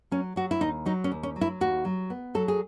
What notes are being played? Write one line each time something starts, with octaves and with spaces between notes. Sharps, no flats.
F#3 C#4
F#3 F#4
E4
D#2 D#4
F#3 D#4
C#4
D#2
C#4
F#3
E4
D#2 F#4
F#3
B3
F#3 A4
G#4